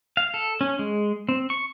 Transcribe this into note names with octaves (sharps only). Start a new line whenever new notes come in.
F5
A4
C#4
G#3
C4
C#6